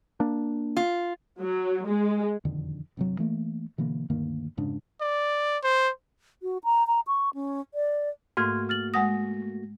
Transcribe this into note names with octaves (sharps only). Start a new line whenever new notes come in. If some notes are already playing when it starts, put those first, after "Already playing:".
A#3 D4
F4
F#3
G#3
E1 F2 D3 D#3
G1 C3 F#3
E3 A3 A#3
B2 D3 E3 A#3
D2 G2 D#3 A#3
F1 G#2 C#3 D4
D5
C5
F#4
A#5
A#5
C#6
C#4
D5
G#2 A3 A#3 F#4 C6 F6 G#6
F6 A6 F#7
G#3 F#5 D#6 A#6